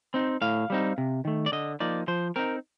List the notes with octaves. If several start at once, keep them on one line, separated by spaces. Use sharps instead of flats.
C4 D#4
A2 F5
G3 C4 D#4
C3
D#3 A3
D5
D3 D#5
F3 A#3 D#4 D5
F3 C5
C4 D#4 A#4